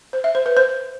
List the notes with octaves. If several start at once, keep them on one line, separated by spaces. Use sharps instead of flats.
C5
E5
C5
B4
C5